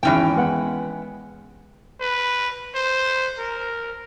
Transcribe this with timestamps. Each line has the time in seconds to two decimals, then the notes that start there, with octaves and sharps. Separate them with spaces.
0.03 G#1 E2 E3 C#4 G5
0.36 G#3 B3 F#5
2.01 B4
2.75 C5
3.38 A#4